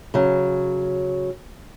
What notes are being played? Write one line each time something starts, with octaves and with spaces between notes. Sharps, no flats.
C#3 F#3